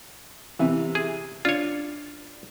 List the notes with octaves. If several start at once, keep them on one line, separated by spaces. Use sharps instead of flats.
C3 E3
G#4
D4 F4 C#5